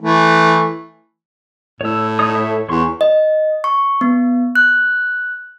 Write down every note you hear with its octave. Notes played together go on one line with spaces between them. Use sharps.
E3 A3
A2 C#5 E6
D#4 C#5 D#6
A4 C#5 E5
E2 C#5 C6 C#6
D#5
C#6
B3
F#6